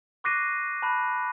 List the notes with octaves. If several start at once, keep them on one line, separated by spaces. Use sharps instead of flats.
C#6 D6 F#6 A#6 C7 D#7
A5 B5 F#6